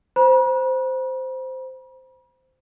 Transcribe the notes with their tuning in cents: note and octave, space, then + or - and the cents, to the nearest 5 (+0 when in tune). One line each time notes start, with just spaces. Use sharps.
C5 -10 B5 -45